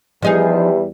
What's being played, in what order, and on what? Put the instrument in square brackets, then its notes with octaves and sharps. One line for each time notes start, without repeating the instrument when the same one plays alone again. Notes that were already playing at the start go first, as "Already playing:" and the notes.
[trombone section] E2 G3 [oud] F3 D#4 G#4